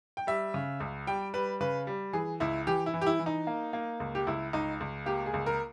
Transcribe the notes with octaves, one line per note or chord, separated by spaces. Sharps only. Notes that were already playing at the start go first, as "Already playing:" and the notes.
G5
G3 E5
C#3
C#2
G3 G5
G3 B4
C#3 B4
G3
E3 G#4
C#2 E4
E3 G4
E4
E3
G4
E4
E3
D#4
A#3
A#3
C#2
G4
C#2 E4
C#2 D#4
C#2
A#3 G4
G#4
C#2
A#4